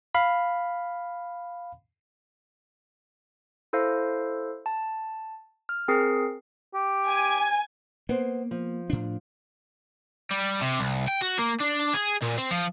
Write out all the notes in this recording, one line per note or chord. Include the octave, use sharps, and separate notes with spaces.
F5 B5
E4 A4 C5 F5
A5
F6
C4 G#4 A#4 C7
G4
G#5
A#3 B3 C5
F3
A2 D4
G3
C3
C2
G5
F#4
A#3
D4
G#4
A#2
C4
F3